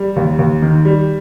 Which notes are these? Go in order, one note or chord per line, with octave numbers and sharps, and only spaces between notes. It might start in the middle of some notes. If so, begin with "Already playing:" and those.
Already playing: G3
D#2
D#2
D#3
G3